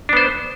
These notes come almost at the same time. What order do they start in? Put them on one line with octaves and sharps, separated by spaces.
D4 B3 C5